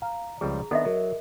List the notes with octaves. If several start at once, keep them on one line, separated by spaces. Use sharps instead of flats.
F5 A#5
C#2 F3 G3 G#4
D#3 B3 D4 A4 D#5 E5
F#3 A#4